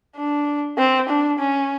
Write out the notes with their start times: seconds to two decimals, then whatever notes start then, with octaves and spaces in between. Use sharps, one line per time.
0.16 D4
0.78 C4
1.09 D4
1.39 C#4